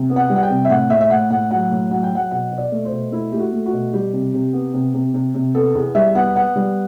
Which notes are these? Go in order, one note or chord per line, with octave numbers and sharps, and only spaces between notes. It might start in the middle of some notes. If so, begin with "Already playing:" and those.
Already playing: C3
B3
F#5
G3
F#5
G5
C3
E5
A2 F#5
A2 E5
E5
A2 F#5
A2 F#5
F#3 F#5
A2
F#3 F#5
G5
F#3 F#5
B2 F#5
B2
D5
A3
C5
B2
A3 E4
A3 G4
F#4
A3
F#4
B2
G3 G4
C3
C3
B3
C3
C3
C3
C3
B3 A4
E2
G3 E5
B3 F#5
B3 F#5
G3